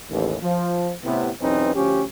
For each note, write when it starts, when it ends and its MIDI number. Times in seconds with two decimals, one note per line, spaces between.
0.10 0.37 33
0.10 0.37 39
0.42 0.93 53
1.04 1.31 45
1.04 1.31 48
1.04 1.31 59
1.42 1.75 35
1.42 1.75 40
1.42 1.75 60
1.42 1.75 61
1.42 1.75 63
1.42 1.75 71
1.76 2.04 38
1.76 2.04 53
1.76 2.04 61
1.76 2.04 67